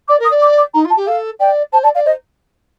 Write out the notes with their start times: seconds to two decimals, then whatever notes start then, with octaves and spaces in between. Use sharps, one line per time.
0.08 D5 D6
0.20 A#4
0.25 D#6
0.31 D5
0.42 D6
0.58 D6
0.74 D#4 A#5
0.85 F4
0.90 A5
0.96 G4
1.07 A4 F5
1.39 D5 G5
1.72 C5 A5
1.83 D5 A5
1.95 D5 F5
2.06 C5 D#5